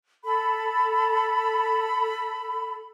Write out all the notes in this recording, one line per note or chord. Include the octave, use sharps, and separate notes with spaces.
A4 B5